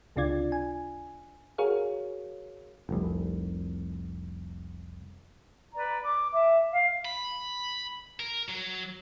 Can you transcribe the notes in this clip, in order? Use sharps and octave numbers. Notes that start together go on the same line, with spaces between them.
C#2 C3 D4 F4 D5 G#6
G#5
F#4 G#4 A#4 C#5 F5
F1 C2
B4 D5 A#5
D6
E5 D6
F5
B5
A#4
F#3